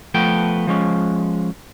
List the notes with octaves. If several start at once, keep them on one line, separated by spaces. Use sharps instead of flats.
F3 A3 B3 G5
F3 G#3 C#4